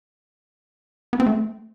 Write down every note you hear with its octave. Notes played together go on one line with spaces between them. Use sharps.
B3
C4
A3